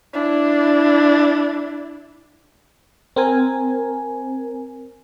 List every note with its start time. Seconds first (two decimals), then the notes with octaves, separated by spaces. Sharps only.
0.14 D4 E4
3.16 C4 A#4 G#5